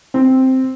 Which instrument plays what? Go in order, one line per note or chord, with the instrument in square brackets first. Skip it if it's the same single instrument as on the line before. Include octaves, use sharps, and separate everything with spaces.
[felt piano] C4